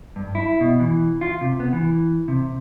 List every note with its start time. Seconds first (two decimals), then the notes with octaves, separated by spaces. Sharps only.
0.16 G2
0.35 E4
0.61 B2
0.80 E3
1.21 F4
1.41 C3
1.60 B3
1.73 E3
2.28 C3